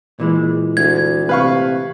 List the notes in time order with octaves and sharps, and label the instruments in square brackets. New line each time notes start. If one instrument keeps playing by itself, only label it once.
[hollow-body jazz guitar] A#2 E3 G#3
[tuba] D2 [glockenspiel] G#6
[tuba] C3 [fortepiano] B4 F5 C#6